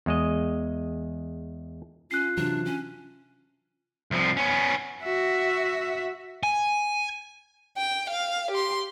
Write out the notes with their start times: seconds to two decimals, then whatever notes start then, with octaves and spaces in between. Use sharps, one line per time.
0.06 E2 G#3 D#5
2.11 C#4 F4 F#6 C7
2.37 C3 E3 F#3 D4
2.65 C#4
4.11 C2 F3
4.37 B3 C#4
5.03 F#4 E5
6.43 G#5
7.77 G5
8.10 F5
8.51 G4 C6